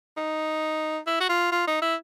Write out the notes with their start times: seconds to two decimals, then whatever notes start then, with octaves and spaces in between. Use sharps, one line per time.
0.17 D#4
1.07 E4
1.20 F#4
1.29 F4
1.52 F4
1.67 D#4
1.82 E4